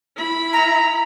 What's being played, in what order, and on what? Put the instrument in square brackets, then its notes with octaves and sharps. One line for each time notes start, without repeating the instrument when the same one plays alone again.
[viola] E4 B5
[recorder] A#5